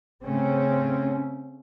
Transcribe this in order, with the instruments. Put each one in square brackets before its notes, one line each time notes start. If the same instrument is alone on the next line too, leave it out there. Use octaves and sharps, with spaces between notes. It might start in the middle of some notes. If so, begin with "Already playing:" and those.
[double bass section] C#3 A3 C4 C#4